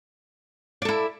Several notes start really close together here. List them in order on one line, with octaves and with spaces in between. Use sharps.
D5 A4 E4